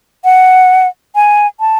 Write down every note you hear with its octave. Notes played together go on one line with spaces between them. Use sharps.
F#5
G#5
A5